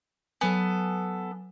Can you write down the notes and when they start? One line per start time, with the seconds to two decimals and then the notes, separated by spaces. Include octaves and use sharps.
0.41 F#3 B3 A4 G#5